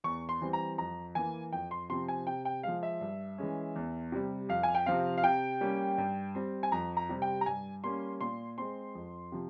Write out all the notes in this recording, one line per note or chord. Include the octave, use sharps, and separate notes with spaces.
E2 C#6
C6
E3 G3 C4
A#5
F2 A#5
E3 A#3 G#5
F2 G5
C6
C3 F3 C4 C6
G#5
C3 G5
G5
F3 G#3 F5
E5
G2
E3 G#3 C#4
E2
C3 G3
F2 F5
G#5
G5
C3 F3 C4 F5
F5
C3 G5
G3 A#3 C#4
G2
G3 C4
G#5
F2 A#5
A#5
C3 G3 C4
G5
A#5
G2 G#5
G3 A#3 C#4 C6
A#2 C6
G#3 C4 C6
F2
C3 F3